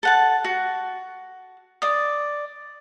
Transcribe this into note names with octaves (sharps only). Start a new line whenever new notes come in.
A4 F#5 A5
F#4
D5 D#6